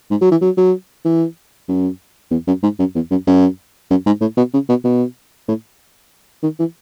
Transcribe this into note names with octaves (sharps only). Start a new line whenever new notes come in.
G#2
F#3
E3
F#3
F#3
E3
F#2
E2
F#2
G#2
F#2
E2
F#2
F#2
F#2
G#2
A2
B2
C#3
B2
B2
A2
D#3
E3